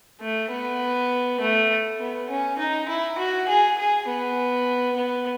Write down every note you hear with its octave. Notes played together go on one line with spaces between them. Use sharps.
A3
B3
A3
B3
C#4
D#4
E4
F#4
G#4
G#4
B3
B3